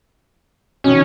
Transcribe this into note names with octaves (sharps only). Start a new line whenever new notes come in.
B2 D#3 C#4